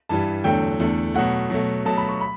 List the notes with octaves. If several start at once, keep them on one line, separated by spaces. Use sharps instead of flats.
G2 E3 G3 A5
E2 D3 F#3 A3 G5
E2 D3 A3
B2 F#3 A3 F#5
B2 F#3 A3
B2 F#3 A3 A5
B5
C#6
B5